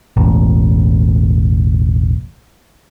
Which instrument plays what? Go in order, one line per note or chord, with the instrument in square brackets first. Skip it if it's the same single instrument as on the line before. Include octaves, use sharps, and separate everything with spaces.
[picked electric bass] E1 A1